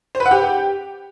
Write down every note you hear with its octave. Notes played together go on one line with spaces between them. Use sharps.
C5
B4
F#5
G4